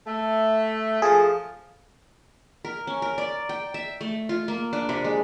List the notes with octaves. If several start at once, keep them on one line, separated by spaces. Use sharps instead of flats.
A3 E5
F3 A3 G#4
A#4
C#4
A#4
D5
G5
E5
A3
F4
A#3
D4
C3
G#3